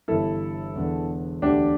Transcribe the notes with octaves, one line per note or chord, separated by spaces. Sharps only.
G1 G2 E3 E4 A4
E1 E2 D3
E1 D2 D3 D4 G4